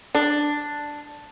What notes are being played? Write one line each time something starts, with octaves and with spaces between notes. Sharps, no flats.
D4